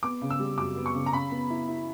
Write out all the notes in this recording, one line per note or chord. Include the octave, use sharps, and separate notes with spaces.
B3 D6
C#3
E6
G3
F#2 D6
B3
C#6
C#3
A#5
C#3 B5
B3
E4
E4